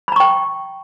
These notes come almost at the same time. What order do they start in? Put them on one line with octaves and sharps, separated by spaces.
B5 A#5 C#6 G5